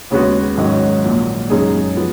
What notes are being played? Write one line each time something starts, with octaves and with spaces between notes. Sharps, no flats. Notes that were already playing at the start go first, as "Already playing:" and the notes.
D#2 C#3 G#3 B3 F#4
G#1 G#2 D#3 F#3 C#4
A#1 A#2 F#3
F#2 C#3 G#3 D#4 G#4
F3 B3